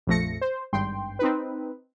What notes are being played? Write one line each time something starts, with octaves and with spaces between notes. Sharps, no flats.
A#1 F2 F3 A3 A#6 C#7
C5
G#1 G2 G5 C6
C4 D#4 B4